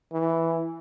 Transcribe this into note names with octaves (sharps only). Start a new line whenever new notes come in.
E3